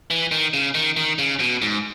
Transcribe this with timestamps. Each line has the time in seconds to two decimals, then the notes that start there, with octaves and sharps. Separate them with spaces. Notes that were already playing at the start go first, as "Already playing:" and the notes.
0.10 E3
0.31 D#3
0.54 C#3
0.75 D#3
0.97 D#3
1.19 C#3
1.40 B2
1.62 G#2